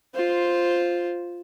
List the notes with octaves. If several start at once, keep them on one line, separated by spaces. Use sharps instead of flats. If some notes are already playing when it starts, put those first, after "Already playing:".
F4 C5